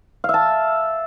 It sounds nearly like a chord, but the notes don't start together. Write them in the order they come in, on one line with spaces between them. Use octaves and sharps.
F5 E5 A5